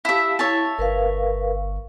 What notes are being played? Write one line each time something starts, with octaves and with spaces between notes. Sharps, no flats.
E4 G4 E5 F5 A5
E4 C#5 E5 A5
G1 A#4 B4 F5